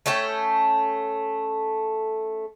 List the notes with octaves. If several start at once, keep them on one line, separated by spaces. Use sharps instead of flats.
A3 C#4 A4 G5